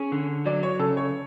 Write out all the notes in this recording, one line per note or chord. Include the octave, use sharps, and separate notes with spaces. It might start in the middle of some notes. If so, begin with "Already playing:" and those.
Already playing: C#4 G#4
D3
F#3 D5
C#5
C#3 A4
C#5